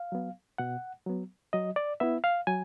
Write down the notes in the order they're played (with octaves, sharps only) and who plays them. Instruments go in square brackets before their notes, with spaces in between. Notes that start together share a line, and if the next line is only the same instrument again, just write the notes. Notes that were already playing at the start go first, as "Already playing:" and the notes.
Already playing: [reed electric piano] F5
F#3 B3
B2 F#5
F#3 B3
F#3 D#5
D5
B3 E4 E5
F5
F#3 G#5